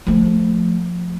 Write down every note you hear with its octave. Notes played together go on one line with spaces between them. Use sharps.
F3 A3